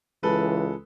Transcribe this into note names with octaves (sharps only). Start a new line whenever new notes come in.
C#2 E3 G#3 A4 B4